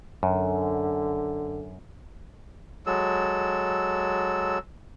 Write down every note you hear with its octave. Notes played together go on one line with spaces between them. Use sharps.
F#2 D3
F#3 G#3 A4 E6